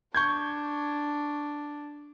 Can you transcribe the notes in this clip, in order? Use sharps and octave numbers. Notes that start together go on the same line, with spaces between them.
D4 C#6 G6 G#6